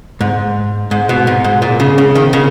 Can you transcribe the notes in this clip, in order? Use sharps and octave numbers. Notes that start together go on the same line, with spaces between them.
G#2
G#2
B2
G#2
G#2
A#2
C#3
C#3
D#3
C#3